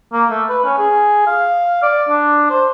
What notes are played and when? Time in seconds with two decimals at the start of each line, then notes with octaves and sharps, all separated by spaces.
0.12 A#3
0.30 A3
0.49 B4
0.64 C#4
0.78 G#4
1.27 F5
1.83 D5
2.09 D4
2.50 C5